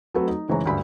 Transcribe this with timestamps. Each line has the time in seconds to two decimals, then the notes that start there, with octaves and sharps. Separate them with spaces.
0.14 F#3 A3 C4 F#4 A4 B4
0.28 D#4
0.49 F#1 E3 G#3 C#5 A#5
0.66 D2 G2 B5